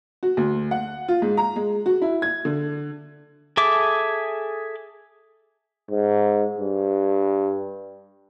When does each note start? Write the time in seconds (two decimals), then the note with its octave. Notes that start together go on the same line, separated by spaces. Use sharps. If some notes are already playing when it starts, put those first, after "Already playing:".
0.23 F#4
0.37 D2
0.71 F#5
1.08 F4
1.22 G#2
1.37 A#5
1.56 G#3
1.86 F#4
2.02 E4
2.22 G#6
2.45 D3
3.57 G#4 A4 E5 D6
5.91 G#2
6.59 G2